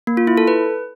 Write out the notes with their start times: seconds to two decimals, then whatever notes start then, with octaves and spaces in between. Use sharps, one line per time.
0.07 A#3
0.17 F4
0.27 E4
0.37 A4
0.48 B4